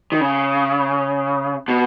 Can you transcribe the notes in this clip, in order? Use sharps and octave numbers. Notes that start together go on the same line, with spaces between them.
D#3
C#3
B2